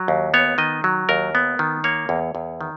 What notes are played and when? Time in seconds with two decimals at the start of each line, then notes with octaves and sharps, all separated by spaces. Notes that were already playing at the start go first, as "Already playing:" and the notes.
Already playing: F#3
0.08 D#2
0.34 B3 C#5
0.58 D#3 D#5
0.84 F#3
1.09 D#2 A#4
1.35 B3
1.59 D#3
1.84 A#3 C#5
2.09 E2
2.35 E2
2.61 D#3